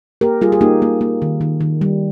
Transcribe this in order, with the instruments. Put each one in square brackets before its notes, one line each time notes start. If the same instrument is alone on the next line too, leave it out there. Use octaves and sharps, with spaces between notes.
[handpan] A#3 G4 A#4
G3 F4 G#4
G#4
A#3 D#4 G4
A#3
A#3
D#3
D#3
D#3
G3